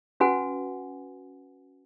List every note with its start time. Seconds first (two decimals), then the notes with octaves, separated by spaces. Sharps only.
0.20 C#4 F#4 B4 F#5 G#5